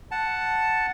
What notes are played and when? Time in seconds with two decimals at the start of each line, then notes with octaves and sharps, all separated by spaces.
0.11 F#5 A5